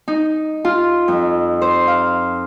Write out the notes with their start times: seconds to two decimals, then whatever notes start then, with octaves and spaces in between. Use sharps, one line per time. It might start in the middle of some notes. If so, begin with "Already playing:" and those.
0.08 D#4
0.65 F4
1.08 F2
1.62 C5
1.87 F5